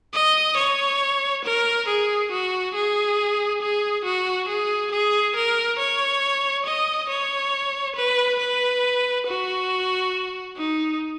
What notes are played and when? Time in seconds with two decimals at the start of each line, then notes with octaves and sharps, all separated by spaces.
0.14 D#5
0.57 C#5
1.45 A#4
1.88 G#4
2.32 F#4
2.74 G#4
3.62 G#4
4.05 F#4
4.49 G#4
4.92 G#4
5.36 A#4
5.78 C#5
6.66 D#5
7.10 C#5
7.96 B4
8.40 B4
9.27 F#4
10.57 D#4